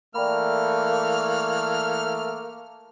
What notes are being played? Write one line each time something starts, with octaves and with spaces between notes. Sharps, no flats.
E3 A3 A#3 D5 G5 B5 F6